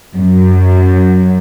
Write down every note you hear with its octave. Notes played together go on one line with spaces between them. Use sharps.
F#2